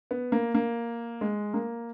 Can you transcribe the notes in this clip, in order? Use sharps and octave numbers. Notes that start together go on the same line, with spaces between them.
B3
A#3
A#3
G#3
A#3